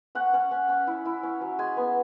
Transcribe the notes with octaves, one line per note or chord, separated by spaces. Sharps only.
C#4 F#5
C#4
C#4
C#4
E4
E4
C#4
F#3
G#3 G#5
B3